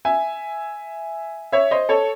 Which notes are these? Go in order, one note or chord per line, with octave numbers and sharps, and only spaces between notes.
E5 G#5
C#5 E5
C5 D#5
A4 C#5